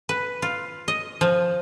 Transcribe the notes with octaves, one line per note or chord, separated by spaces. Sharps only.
B4
F4
D#5
F3